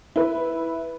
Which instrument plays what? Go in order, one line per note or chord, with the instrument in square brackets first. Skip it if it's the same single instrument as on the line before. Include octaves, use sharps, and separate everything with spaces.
[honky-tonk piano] E4 B4